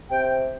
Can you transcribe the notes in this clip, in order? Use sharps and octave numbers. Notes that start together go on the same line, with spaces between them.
C3 G5